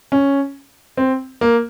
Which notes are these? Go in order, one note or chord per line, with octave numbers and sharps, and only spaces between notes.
C#4
C4
A#3